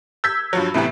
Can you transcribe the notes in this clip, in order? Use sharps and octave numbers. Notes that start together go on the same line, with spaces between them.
E6 G6 G#6 B6
G2 F3 F#3
A2 C3 E3 B3 B5